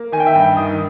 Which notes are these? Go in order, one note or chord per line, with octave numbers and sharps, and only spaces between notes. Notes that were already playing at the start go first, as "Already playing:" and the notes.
Already playing: A#3
D#3 G#5
G5
E5
G2 G5
D#3 D#6